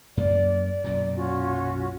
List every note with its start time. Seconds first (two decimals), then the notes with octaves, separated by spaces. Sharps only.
0.17 F#2 A#3 D5
0.84 B1 F#2 A#2
1.15 C#4 F4 F#4